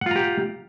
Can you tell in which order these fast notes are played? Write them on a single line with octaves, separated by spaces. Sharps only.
F#5 F4 A#5 G4